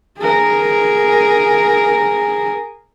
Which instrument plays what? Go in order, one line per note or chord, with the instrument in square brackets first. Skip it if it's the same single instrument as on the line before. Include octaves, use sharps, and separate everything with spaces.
[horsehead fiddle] G#4 A#4